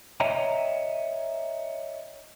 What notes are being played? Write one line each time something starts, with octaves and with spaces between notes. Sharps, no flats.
C#5 D#5 E5 G5 A#5